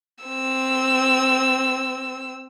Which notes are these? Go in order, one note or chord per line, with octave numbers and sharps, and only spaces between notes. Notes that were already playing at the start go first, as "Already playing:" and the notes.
C4 E6